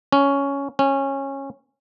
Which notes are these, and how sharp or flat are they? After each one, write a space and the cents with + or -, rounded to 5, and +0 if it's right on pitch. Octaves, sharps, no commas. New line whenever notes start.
C#4 +10
C#4 -15